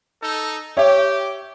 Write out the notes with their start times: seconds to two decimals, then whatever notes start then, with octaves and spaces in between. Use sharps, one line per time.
0.21 D#4 A4
0.77 G4 C#5 E5